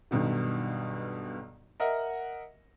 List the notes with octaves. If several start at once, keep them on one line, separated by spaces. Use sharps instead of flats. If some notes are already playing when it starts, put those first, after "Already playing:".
B1 G2 B2 D#3
A#4 D#5 E5 F#5